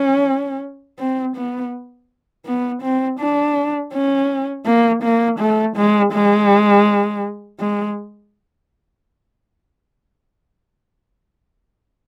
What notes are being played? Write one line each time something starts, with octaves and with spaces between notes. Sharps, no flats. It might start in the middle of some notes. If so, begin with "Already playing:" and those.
Already playing: C#4
C4
B3
B3
C4
D4
C#4
A#3
A#3
A3
G#3
G#3
G#3